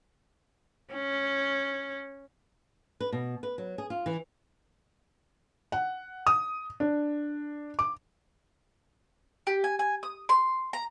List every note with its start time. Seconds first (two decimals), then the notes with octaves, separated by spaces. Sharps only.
0.93 C#4
3.00 B4
3.12 B2
3.43 B4
3.58 F#3
3.78 G#4
3.90 F4
4.06 E3
5.72 F#5
6.27 D#6
6.80 D4
7.79 D6
9.47 G4
9.64 G#5
9.79 G#5
10.03 D#6
10.29 C6
10.73 A#5